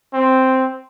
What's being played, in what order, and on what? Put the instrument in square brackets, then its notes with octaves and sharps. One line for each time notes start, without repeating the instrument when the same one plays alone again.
[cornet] C4